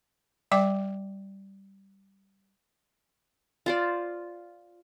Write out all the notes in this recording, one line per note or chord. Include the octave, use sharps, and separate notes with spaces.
G3 D5 G5 D6
F4 C5 D5